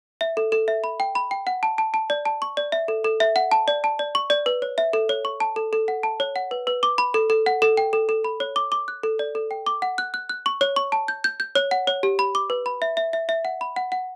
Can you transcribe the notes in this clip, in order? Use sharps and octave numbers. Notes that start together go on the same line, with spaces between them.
E5
A4
A4
E5
B5
G5
B5
G5
F#5
A5
A5
A5
D5
A5
C#6
D5
E5
A4
A4
E5
F#5
A5
D5
A5
D5
C#6
D5
B4
C#5
E5
A4
C#5
C#6
A5
A4
A4
F#5
A5
C#5
F#5
B4
B4
D6
B5
A4
A4
F#5
A4
G5
A4
A4
B5
C#5
D6
D6
F#6
A4
D5
A4
G5
D6
F#5
F#6
F#6
F#6
C#6
C#5
C#6
A5
G6
G6
G6
C#5
F#5
C#5
G4
B5
D6
B4
B5
E5
E5
E5
E5
F#5
B5
F#5
F#5